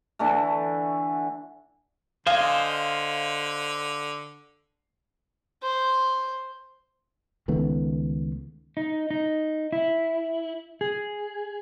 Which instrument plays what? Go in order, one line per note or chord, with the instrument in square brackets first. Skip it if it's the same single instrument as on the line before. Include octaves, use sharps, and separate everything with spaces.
[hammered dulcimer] D3 E3 A3
[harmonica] D3 [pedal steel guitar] C5 D#5 G#5 [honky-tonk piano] F5
[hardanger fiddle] C5
[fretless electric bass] C#2 D#3 A3 B3
[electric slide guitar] D#4
D#4
E4
G#4